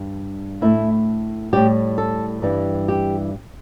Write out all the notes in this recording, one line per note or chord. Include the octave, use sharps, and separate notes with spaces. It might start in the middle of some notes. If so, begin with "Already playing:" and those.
Already playing: G2 G3
A2 A3 E4
A2 G3 G4
A4
G2 E3 G3
G4